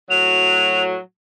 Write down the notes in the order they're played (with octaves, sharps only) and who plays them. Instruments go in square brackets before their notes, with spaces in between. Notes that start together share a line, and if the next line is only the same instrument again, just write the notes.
[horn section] A2 F#3 [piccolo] F7